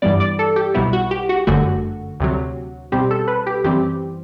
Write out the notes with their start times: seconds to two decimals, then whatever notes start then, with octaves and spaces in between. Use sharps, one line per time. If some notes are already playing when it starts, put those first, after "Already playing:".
0.02 G2 E3 G3 B3 D5
0.20 D5
0.39 A4
0.56 G4
0.74 B1 B2 G3 B3 E4
0.93 F#4
1.11 G4
1.29 F#4
1.47 G1 F#2 D3 A3 F#4
2.20 D2 C3 F#3
2.92 C2 B2 G3 C4 G4
3.11 A4
3.28 B4
3.47 G4
3.64 F#2 E3 G3 C4 G4